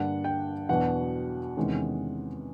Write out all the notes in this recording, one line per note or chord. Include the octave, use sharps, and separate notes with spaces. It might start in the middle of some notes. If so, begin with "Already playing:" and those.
Already playing: G2 D3 G3 A#3 D4 F#5
G5
E2 B2 F#3 B3 D4 F#5
E2 C3 D#3 G#3 C#4